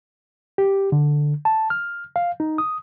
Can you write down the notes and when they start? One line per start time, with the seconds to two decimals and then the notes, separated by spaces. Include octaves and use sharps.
0.58 G4
0.92 D3
1.45 A5
1.70 F6
2.16 F5
2.40 D#4
2.58 D#6